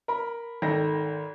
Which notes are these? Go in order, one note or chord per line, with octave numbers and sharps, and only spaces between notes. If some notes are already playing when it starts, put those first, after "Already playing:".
A#4 B5
G#1 D#3 A4 G5 A#6